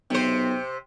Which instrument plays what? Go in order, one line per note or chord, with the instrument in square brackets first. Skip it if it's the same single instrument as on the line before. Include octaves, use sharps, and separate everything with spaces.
[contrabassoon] B1 [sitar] C3 C5